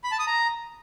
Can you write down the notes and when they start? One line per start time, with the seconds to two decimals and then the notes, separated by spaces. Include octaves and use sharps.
0.04 B5
0.12 A5
0.19 D#6
0.27 A#5